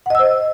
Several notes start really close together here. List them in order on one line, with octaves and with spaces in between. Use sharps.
F#5 D#5 E6 C5